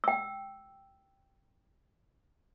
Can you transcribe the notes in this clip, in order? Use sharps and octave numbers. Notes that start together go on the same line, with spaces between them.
G5 E6